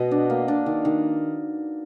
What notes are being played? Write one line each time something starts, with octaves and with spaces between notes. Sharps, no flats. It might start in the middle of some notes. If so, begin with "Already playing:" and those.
Already playing: B2 B3 B4 D#5
D4
A#3
D4
D#3
D#3